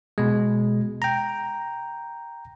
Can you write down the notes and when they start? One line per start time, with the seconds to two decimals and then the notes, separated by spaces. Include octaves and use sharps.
0.18 B2 G#3
1.02 G5 A#5